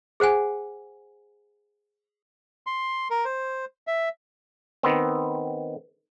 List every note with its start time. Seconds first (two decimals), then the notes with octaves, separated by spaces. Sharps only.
0.20 G#4 C5 F#5 G#5
2.67 C6
3.10 A#4
3.25 C5
3.87 E5
4.83 D#3 B3 C4